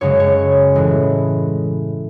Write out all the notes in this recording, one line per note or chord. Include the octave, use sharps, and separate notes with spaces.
F#2 C#3 G#3 C#5
C#5
A2 E3 G#3